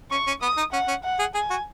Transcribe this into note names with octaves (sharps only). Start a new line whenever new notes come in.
C#4 C#6
C#4
B3 D#6
D#4
C#4 F#5
C#4
F#5
G#4
G#4 G#5
F#4